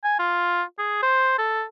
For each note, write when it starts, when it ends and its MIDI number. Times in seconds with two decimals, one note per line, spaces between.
0.04 0.15 80
0.19 0.63 65
0.79 1.02 68
1.03 1.37 72
1.38 1.63 69